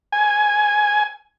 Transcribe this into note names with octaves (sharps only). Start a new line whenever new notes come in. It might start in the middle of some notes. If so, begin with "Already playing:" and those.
G#5